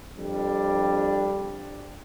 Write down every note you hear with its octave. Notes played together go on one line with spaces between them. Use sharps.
F2 G3 D4